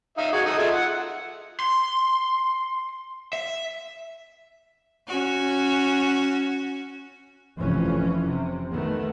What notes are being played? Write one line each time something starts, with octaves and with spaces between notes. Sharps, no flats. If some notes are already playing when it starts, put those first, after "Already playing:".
D#4 E5 F5
F#4 G#4
D#4 A4 D#5
F4 G#4 E5
F#5
C6
E5
C#4 F#4
F1 F2 E3 C#4
C3
D#3 A3 B3